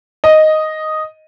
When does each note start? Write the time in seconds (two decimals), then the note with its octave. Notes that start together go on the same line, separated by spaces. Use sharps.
0.24 D#5